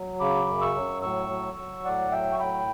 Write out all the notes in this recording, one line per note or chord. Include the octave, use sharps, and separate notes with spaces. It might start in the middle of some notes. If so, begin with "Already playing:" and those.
Already playing: F#3
C#3 B5 D6
F#2
C#6 E6
F#3
A2 C#6 E6
F#3
F#3
A2 D5 F#5
F#3 E5 G5
C#6
A2 G5 B5